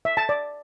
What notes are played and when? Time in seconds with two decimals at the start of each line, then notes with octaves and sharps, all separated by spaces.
0.05 E5
0.17 A5
0.29 D5